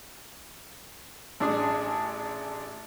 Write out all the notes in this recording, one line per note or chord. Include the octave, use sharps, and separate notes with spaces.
A1 D4 G#4